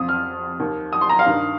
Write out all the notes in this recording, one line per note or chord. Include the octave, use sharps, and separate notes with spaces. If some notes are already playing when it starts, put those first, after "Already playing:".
Already playing: F2 F3 D#6
F6
D#2 D#3
D#6
C6
A#5
F5
G2 D#3